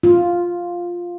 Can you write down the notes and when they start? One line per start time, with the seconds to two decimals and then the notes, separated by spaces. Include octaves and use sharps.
0.03 F4